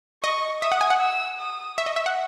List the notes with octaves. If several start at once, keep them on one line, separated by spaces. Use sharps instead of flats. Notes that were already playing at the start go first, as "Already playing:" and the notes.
D#5 C#6
E5 D#6
F#5
G#5
F#5
E6
D#6
E5 C#6
D#5
E5
F#5